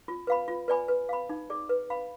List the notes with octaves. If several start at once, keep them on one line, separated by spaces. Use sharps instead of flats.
F4
B4 F5 B5
F4
B4 D5 G#5 B5
B4
F5 B5
D#4
G#4 D5
B4
F5 B5